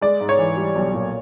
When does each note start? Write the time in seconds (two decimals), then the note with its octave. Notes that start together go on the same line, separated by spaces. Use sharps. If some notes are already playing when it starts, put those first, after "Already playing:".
0.01 G#3 D5
0.21 G#2
0.29 C#5
0.39 E3
0.57 G3
0.76 B1
0.94 A#2